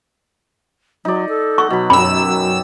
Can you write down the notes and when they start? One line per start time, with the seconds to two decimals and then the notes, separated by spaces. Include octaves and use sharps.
1.05 F#3 D#4 D5
1.29 A4
1.58 F#5 C#6
1.70 B2 F#3 B5
1.90 F#2 G4 B5 E6